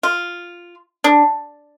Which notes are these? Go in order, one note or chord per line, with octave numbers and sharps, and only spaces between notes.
F4
D4